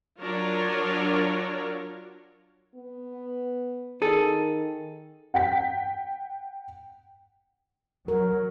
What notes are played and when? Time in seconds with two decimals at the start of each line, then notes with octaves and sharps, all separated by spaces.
0.20 F#3 D4 F4 A#4 C#5
2.75 B3
4.02 D#3 G#4 A4
5.34 F#5 G5 B6
8.08 F#3 A#4